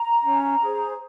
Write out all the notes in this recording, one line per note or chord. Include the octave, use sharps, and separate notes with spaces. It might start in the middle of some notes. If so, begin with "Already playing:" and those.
Already playing: A#5
C#4
G#4 C5